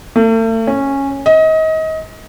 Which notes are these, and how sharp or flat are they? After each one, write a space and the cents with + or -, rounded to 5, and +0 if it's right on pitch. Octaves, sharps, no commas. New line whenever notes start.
A3 +40
C#4 -10
D#5 +30